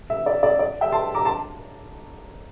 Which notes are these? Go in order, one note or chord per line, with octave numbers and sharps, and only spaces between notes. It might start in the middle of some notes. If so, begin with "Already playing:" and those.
E5
D5
D5
D5
E5 G5
A5 C6
A#5 D6
A5 C6